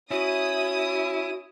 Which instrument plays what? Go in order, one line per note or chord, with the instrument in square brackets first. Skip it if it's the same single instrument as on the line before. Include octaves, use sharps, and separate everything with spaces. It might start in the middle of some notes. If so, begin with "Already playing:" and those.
[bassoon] C#4 [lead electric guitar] E4 [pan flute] F#4 [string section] D#6